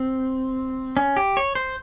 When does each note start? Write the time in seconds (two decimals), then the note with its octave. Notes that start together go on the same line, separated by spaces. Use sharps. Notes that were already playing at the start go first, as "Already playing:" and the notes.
Already playing: C4
0.97 C#4
1.17 G4
1.37 C#5
1.55 C5